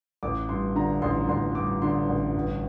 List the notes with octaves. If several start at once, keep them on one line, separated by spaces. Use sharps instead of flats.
A1 D6
G2 C6
D3 A#5
A1 C6
A1 C6
G2 D6
D3 C6
A1
G1